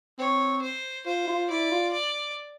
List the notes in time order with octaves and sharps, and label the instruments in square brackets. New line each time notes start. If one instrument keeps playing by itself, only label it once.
[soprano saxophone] C4 [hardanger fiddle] C#5
[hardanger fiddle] C5
[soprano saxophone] F4 [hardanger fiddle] C5
[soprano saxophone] F4
[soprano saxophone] E4 [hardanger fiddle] D5
[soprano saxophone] F4
[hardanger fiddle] D5